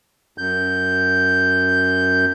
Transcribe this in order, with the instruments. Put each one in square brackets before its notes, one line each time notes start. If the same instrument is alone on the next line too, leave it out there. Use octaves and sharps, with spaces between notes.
[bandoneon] F#2 G6